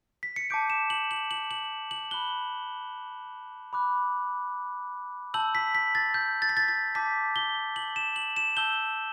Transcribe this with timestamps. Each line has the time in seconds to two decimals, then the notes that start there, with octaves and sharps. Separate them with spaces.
0.23 B6
0.36 C#7
0.50 A5 D6 G6 D7
0.70 E7
0.90 F#7
1.11 F#7
1.31 F#7
1.51 F#7
1.91 F#7
2.11 B5 F#6 G7
3.73 B5 D6 F#6
5.34 A5 E6 G6 F#7
5.55 B6
5.75 B6
5.95 A6
6.14 G6
6.42 A6
6.49 B6
6.57 A6
6.68 A6
6.95 A5 D6 G6 B6
7.36 G7
7.76 F#7
7.96 E7
8.16 F#7
8.37 E7
8.57 A5 E6 G6 G7